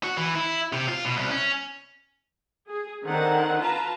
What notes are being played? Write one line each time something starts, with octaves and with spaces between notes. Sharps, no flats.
F#4
E3
E4
C3
F4
B2
C2
C#4
G#4
D3 D#3 C4 F#5
F4 B4 A5 A#5